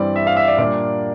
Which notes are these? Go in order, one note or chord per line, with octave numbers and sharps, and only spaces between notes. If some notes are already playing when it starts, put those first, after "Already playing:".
Already playing: G2 E3 G3 C4 D5
E5
F5
E5
D5
A#2 G3 A#3 D4 D5